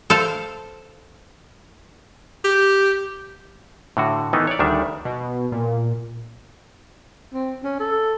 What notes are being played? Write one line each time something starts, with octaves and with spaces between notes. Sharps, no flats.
A4 C5 F5
G4
A2 D3 F#4
D#3 E3 A3 B3 D#4
C#5 D5
D2 D#3 G3 D4 E5
B2
A#2
C4
C#4
A4